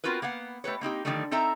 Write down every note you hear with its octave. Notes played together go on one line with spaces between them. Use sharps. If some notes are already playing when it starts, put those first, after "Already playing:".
B3 C4 F4 F#4 A#4 B4
A#3 B3 F5 F#5
A3 G4 B4 C#5
A#3 C4 D#4 G4
D3 D#3 F3 G3 A3
C4 D#4 A4 E5 A#5